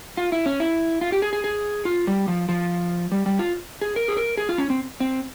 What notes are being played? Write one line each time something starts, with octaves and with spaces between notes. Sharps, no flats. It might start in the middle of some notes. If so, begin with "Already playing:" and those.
F4
E4
C#4
E4
F4
G4
G#4
G#4
G#4
F4
G3
F3
F3
G3
G3
F4
G#4
A#4
G#4
A#4
G#4
F4
C#4
C4
C4